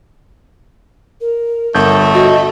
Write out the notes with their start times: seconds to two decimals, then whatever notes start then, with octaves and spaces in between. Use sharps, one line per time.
1.21 A#4
1.75 G1 A3 G6
2.14 F#4 D#5